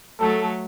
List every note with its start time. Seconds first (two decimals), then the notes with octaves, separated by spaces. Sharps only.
0.20 F#3 A3 A4